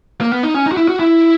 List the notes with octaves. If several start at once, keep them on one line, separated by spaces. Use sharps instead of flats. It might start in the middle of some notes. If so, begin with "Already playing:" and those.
A#3
B3
D#4
C#4
D#4
F#4
E4
F#4
E4